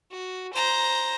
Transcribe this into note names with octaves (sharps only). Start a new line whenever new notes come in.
F#4
C5 A#5